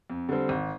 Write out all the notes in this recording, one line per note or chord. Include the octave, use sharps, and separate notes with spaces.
F2
D3 G3 C4
G#1